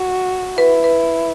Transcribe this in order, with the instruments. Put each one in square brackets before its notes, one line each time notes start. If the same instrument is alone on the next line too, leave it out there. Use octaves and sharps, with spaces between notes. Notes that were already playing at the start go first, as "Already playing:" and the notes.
Already playing: [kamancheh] F#4
[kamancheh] E4 [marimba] B4
[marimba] B4